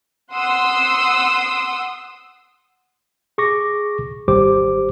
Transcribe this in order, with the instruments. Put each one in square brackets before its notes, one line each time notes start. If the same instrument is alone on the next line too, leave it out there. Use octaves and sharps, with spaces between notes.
[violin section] F#5 C6 D#6 E6
[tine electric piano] G#4 C#6 D6 A#6
G#1 G3 G4 C5 D6